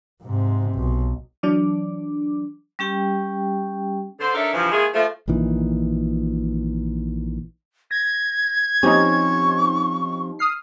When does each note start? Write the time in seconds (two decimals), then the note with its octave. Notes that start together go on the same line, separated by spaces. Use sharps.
0.22 G#2 C3
0.75 B1
1.43 E3 F#3 D4 D6
2.79 G3 C#4 G4 G5
4.20 D3 C5
4.34 D4 D#4 A4 A#4 C#5 E5
4.53 G2 C#3 E3 F3
4.71 D#3 G#3 A#3 E4 G#4
4.94 F3 A3
5.28 A#1 A#2 D#3 E3
7.91 G#6 A#6
8.83 F3 C4 C#4 D#4 G4 C#6
10.39 D#6 F6 C7